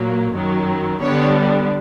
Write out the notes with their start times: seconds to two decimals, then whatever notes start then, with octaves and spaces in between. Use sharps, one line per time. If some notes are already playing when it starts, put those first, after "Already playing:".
Already playing: A#2 F#3 A#3
0.33 F#2 D#3 F#3
1.01 D3 G3 B3 D4 C#5